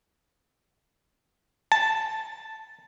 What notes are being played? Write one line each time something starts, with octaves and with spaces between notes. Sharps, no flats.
A5